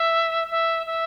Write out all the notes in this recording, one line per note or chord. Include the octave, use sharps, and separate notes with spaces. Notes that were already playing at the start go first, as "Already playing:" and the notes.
Already playing: E5
E5
E5